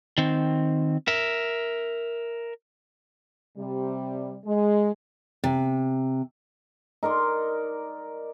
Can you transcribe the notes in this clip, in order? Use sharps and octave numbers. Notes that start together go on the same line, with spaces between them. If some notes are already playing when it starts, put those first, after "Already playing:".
D#3 C4
A#4 E5
C3 G3
G#3
C3
D#4 A#4 D5 C6